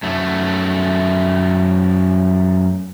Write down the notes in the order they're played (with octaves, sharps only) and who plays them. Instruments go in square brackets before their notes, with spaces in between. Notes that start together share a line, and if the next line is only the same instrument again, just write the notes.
[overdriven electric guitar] F#2 A3